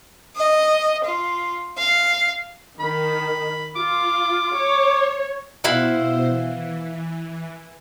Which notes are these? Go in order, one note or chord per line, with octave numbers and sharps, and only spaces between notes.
D#5
F4
F5
D#3 B5
F4 D6
C#5
B2 E4 C5 F5 F#5
E3